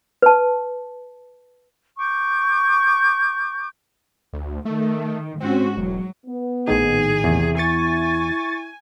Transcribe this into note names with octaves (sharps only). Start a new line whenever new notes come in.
B4 A5
C#6 D6 G6
D2
D#3 A3
G#2 C4 C#4 F#4
E1 F#3
B3
A#1 A2 D#3 G#4
E2 C3
E4 G#5 C#6 A6